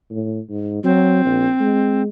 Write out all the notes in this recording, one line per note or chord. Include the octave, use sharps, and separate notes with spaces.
A2
G#2
F#3 C4
A#1
G#3